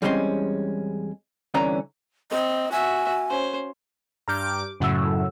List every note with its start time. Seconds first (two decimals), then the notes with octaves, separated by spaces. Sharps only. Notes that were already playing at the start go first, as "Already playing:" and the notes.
0.02 E2 G3 G#3 C4 C#4 C6
1.54 C2 D3 E3 C#4 D5 A#5
2.31 C4 D#5
2.72 F#4 E5 G#5
3.30 C#4 C5
4.28 G2 A#5 D6 F6 G6
4.80 F#2 A2 C#3 F#3 F#5 E6